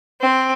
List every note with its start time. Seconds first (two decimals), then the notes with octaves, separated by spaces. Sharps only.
0.21 C4